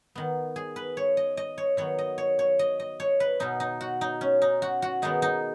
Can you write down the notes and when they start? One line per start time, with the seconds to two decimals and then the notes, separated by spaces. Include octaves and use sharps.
0.15 D#3 B3
0.56 G#4
0.76 B4
0.97 C#5
1.17 D#5
1.37 D#5
1.58 C#5
1.77 D#3 F#3 B3 C#5
1.98 D#5
2.18 C#5
2.39 C#5
2.59 D#5
2.80 D#5
3.00 C#5
3.20 B4
3.40 B2 B3 D#4
3.60 D#4
3.81 F#4
4.01 D#4
4.21 C#4
4.42 D#4
4.62 F#4
4.82 F#4
5.02 D#3 G#3 B3 D#4
5.22 D#4